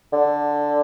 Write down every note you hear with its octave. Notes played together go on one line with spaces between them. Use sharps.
D3